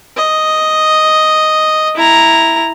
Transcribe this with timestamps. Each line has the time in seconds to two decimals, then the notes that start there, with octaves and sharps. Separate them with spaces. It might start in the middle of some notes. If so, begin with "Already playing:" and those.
0.17 D#5
1.95 E4 A#5